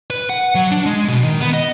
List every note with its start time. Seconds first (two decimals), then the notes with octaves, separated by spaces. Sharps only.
0.10 B4
0.29 F#5
0.55 F#3
0.71 D4
0.86 G#3
1.08 B2
1.24 D#3
1.41 B3
1.54 D#5